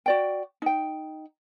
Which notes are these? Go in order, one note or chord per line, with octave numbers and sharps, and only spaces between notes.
F#4 D5 G5
D#4 G5